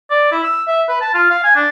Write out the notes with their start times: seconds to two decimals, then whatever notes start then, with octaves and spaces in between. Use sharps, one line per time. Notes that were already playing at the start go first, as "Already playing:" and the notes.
0.10 D5
0.32 E4
0.43 E6
0.67 E5
0.89 B4
1.01 A5
1.14 F4
1.30 F5
1.44 G#5
1.55 D4